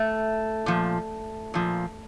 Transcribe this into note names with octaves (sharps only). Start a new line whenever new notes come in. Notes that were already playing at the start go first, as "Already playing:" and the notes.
Already playing: A3
A#2 F3
A#2 F3